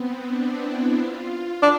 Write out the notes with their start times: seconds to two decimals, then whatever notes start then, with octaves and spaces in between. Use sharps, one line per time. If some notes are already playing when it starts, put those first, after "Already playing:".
Already playing: B3 C4
0.25 D4
0.62 E4
0.97 F4
1.63 D4